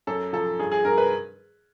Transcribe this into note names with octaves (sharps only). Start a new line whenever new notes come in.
F#2 A4
F3 A4
G2 G#4
G#4
G2 A#4
B4